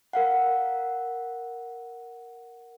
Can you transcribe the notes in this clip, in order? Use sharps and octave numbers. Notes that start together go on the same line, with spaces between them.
A#4 F5 F#5